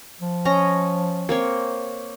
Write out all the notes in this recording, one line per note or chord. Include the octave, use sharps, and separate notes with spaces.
F3
C#4 D#5 A#5
A#3 C4 C#5